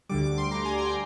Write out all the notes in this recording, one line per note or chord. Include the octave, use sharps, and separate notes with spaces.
D2 D3 G3 D6
D6
C6
D2 D3 G3 A#5
G#5
A#5
G5